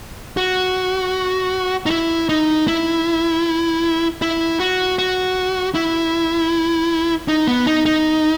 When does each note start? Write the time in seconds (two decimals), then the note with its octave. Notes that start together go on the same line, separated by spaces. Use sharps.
0.37 F#4
1.86 D#4
1.91 E4
2.29 D#4
2.68 E4
4.22 E4
4.60 F#4
4.99 F#4
5.75 E4
7.28 D#4
7.47 B3
7.67 D#4
7.86 D#4